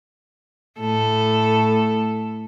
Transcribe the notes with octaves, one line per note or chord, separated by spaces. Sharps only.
A2 A4